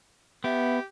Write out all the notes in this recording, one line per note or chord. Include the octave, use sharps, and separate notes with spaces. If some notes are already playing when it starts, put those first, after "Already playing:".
B3 G4 E5